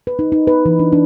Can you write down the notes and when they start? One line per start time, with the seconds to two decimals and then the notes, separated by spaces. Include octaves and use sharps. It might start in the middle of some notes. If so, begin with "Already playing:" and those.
0.07 B4
0.19 D#4
0.32 D#4
0.47 B4
0.66 E3
0.79 D4
0.92 D4